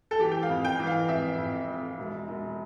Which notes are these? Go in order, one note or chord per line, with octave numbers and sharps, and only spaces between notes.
A4
E3 G4
G5
F5
F2
G5
E3
F5
F2 E5
F2
F2
E1
E1